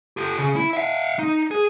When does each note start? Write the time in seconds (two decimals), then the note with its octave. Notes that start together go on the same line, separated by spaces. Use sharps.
0.17 G4 A4
0.38 C#3
0.56 E4
0.73 E5 F5
1.19 D#4
1.51 G#4